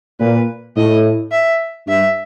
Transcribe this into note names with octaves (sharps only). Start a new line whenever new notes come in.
A#2 B4
A2 D#5
E5
G2 E5